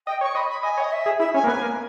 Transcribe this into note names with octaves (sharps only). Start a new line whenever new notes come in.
D#5 G5
C#5
C#6
D#5 B5
B5
D#5 G#5
C#5 D#5
E5
G#4
E4 E5
C#4 G#5
A#3
B3 G#5
A#3